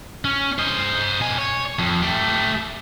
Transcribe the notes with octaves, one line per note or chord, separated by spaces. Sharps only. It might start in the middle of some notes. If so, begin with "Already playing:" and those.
C#4
C5 D#5
B2 G#5
C#5
F2
A3 G4